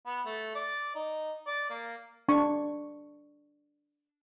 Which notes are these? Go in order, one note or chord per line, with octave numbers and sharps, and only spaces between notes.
B3
A3
D5
D#4
D5
A#3
D4 C#6